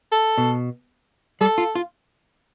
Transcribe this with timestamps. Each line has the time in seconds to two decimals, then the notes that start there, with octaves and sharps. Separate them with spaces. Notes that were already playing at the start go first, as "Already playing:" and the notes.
0.12 A4
0.38 B2
1.41 G3 A4
1.58 F4
1.75 F4